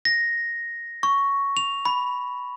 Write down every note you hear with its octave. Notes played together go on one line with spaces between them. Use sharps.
A#6
C#6
F7
B5